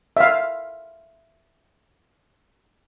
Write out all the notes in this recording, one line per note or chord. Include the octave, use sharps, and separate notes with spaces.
E5 F5